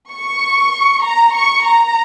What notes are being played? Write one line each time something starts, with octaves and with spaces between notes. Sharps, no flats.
C#6
A#5
C#6
A#5